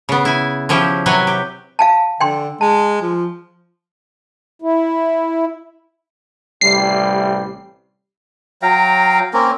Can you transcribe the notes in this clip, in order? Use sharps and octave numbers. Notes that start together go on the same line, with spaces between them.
C#3 B3
E4 G#5
F3 C#4 E4 G4
C3 F#3 B4 C#5 G#5
G4
F5 G#5 A5
D3 G5 G#5 C6
G#3 A5
F3
E4
A1 C3 G3 C7
F#3 F5 G5 A#5
A#3 C4 C#4 A#4